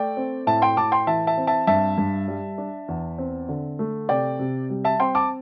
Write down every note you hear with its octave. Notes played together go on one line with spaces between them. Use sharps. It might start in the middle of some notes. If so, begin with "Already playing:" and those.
Already playing: A3 D5 G5
C4
A2 E5 A5
G5 C6
A2 A5 D6
G5 C6
E3 E5 A5
E5 A5
C4
E5 A5
G2 E5 A5
G2
G3
D4
E2
C4
D3
A3
C3 D5 G5
C3
G3
E5 A5
C4 G5 C6
A5 D6